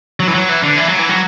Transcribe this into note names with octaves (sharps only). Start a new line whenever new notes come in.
F#3
E3
F#3
E3
D3
E3
F#3
E3
F#3